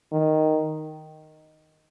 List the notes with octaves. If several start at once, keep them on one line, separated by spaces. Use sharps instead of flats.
D#3